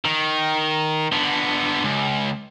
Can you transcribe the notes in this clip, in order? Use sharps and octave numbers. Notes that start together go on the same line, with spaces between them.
D#3
D3 B3
C#2